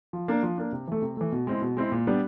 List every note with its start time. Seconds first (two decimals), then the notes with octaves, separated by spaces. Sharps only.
0.13 F3
0.28 A#3 D4
0.43 F3
0.58 A#3 D4
0.72 C3
0.88 E3 A3
1.02 C3
1.17 E3 A3
1.32 B2
1.47 G#3 C4 E4
1.62 B2
1.77 G#3 C4 E4
1.92 A#2
2.07 G3 B3 D4